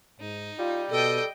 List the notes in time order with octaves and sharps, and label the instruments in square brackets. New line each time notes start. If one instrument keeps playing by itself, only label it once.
[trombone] G#2 [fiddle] D#4
[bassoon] G3 [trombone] F4
[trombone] B2 [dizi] A4 [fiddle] D#5 G5